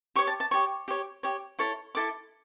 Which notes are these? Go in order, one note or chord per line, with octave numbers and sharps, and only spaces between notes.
G4 C#5 C#6
A5
A5
G4 C#5 C#6
G4 C#5
G4 C#5
E4 A4 C#5 C#6
E4 A4 D6